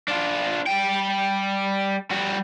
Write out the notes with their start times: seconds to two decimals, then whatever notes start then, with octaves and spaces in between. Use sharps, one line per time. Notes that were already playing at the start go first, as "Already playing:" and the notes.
0.08 D4 F4
0.66 G3 G5
2.11 G3 F#4